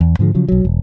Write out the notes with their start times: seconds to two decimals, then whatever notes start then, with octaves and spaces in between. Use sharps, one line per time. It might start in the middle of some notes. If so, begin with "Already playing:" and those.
0.01 E2
0.19 G#2 D3 F3 G#3
0.35 C#3 F3 F#3
0.48 B1 F#3
0.65 E1